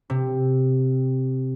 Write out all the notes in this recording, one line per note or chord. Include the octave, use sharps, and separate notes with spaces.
C3